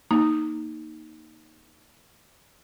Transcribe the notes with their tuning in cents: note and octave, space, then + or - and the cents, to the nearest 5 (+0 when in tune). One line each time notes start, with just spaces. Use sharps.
A#3 +0 D#4 +0